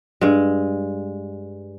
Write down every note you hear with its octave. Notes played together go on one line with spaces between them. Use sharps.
G2 G#3